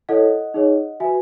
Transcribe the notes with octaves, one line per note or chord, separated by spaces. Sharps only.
E4 A4 C#5 D#5 F#5
D#4 G#4 C#5
F#4 B4 E5 G#5